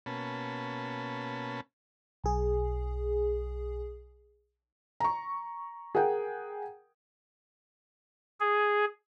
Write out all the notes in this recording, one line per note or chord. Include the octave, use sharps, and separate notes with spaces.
B2 A#3 C#4 A5 B5
B1 G#4
A#5 C#6
G#4 A#4 F#5 G5
G#4